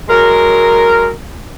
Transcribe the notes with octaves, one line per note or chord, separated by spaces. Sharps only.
F#3 G#3 A#4